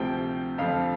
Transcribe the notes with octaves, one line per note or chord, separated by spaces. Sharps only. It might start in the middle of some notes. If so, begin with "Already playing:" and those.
Already playing: D2 C3 F3 G5
F2 D3 F3 F5